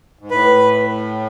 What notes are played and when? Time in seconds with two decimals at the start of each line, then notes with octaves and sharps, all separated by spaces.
0.19 G#2
0.30 A2 B4